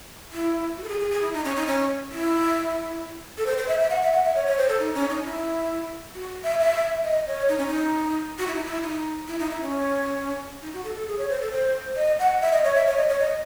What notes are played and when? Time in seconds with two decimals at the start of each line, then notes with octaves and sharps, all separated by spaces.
0.33 E4
0.77 F#4
0.84 A4
0.89 G#4
0.99 G#4
1.11 G#4
1.22 E4
1.33 D#4
1.45 C#4
1.56 D#4
1.67 C#4
2.12 E4
3.38 A4
3.46 C5
3.58 C5
3.68 E5
3.79 E5
3.90 F#5
4.02 E5
4.13 F#5
4.24 E5
4.35 C#5
4.47 C#5
4.58 C5
4.69 A4
4.80 D#4
4.95 C#4
5.10 D#4
5.25 E4
6.15 F#4
6.44 E5
6.60 E5
7.04 D#5
7.27 C#5
7.49 D#4
7.58 C#4
7.67 D#4
8.39 F#4
8.47 E4
8.55 D#4
8.64 E4
8.83 D#4
9.28 E4
9.39 D#4
9.50 E4
9.61 C#4
10.62 D#4
10.73 F#4
10.84 A4
10.96 A4
11.07 G#4
11.18 C#5
11.29 C5
11.41 A4
11.52 C5
11.96 D#5
12.19 F#5
12.41 E5
12.52 D#5
12.64 C#5
12.75 E5
12.87 C#5
12.97 D#5
13.09 C#5
13.20 D#5